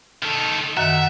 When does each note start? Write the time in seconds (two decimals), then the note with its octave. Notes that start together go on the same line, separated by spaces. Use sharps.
0.23 D#3 A4
0.77 F#2 D#3 E5 F#5